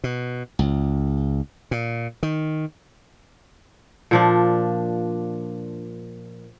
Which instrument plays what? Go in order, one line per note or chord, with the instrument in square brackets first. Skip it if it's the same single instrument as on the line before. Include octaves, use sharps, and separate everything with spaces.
[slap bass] B2
C#2
A#2
D#3
[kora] A#2 F3 D4